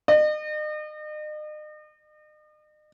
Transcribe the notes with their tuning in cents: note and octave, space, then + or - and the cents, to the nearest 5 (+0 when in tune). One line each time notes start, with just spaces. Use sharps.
D#5 -40